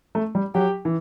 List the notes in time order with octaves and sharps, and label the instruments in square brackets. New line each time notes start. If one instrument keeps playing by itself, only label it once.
[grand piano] A3
G3
[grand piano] F#3 [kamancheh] G4
[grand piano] E3